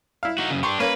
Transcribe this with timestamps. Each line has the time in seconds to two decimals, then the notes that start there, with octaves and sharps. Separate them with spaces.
0.23 E4 F5
0.38 D#4 F#4
0.51 F#2 C#3
0.63 D4 G4 C6 C#6
0.80 A#3 C#4 B4